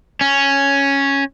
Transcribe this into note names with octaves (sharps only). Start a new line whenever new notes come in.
C#4